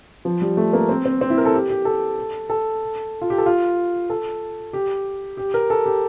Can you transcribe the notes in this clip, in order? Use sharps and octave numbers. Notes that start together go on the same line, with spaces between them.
F3
G3
A3
A#3
C4
C4
C4
E4
A#4
A4
G4
G4
A4
A4
F4
G4
A4
F4
A4
G4
G4
A#4
A4
G4